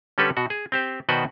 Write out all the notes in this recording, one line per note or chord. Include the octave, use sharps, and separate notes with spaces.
D3 G3 C#4 G4 A4 B4
B2 F#4
G#4
C4 G4 C5
B2 D#3 F#4 B4 C5 D5